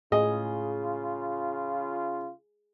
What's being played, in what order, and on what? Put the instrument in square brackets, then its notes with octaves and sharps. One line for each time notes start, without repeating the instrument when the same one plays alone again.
[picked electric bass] A2 [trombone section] C#3 F4 [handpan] G#4 [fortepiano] D#5